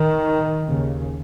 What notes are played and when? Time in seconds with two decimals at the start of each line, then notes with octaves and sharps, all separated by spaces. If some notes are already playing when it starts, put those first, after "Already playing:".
Already playing: D#3
0.68 D#2 C#3